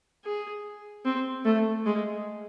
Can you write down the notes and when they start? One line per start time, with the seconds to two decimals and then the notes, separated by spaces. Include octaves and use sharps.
0.25 G#4
1.05 C4
1.45 A3
1.86 G#3